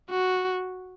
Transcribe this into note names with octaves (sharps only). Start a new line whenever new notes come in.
F#4